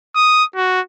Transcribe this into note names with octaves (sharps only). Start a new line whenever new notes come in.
D#6
F#4